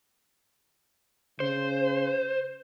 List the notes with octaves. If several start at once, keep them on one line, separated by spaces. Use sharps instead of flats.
C#3 C5